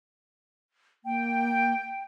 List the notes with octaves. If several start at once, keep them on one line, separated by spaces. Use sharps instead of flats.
A#3 G5